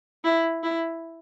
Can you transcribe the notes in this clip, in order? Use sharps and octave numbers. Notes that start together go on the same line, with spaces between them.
E4
E4